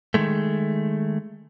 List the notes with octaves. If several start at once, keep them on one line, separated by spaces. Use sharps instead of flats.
D#3 G#3 A3